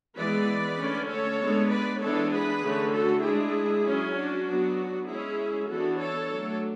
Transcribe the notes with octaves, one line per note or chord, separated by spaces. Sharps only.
E3 G#3 B3 B4 D5
D3 A3 C#4
A4 C#5
G#3 B3 D4
B4 D5
E3 G#3 B3 D4 A4 C#5
G#4 B4
D3 A3 C#4
F#4 A4
G#3 D4 E4 G#4
F#3 C#4
D4 F#4
F#3 B3 D4
G#3 C#4 E4 G#4
E3 B3 D4 F#4 A4
A4 C#5
F#3 A3 D4